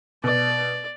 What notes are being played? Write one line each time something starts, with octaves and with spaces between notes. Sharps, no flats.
B2 D5